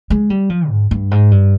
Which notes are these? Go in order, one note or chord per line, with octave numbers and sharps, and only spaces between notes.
G#3
G3
F3
G#2
G2
G#2
G2